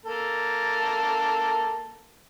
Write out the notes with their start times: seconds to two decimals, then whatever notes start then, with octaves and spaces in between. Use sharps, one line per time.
0.05 A#3 A4 A5